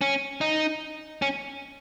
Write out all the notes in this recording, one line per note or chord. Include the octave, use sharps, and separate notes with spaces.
C#4
D#4
C#4